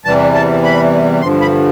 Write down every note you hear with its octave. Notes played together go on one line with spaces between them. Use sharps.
E2 C3 E3 G3 A5
A5
B5
G2 D3 F3 C6
B5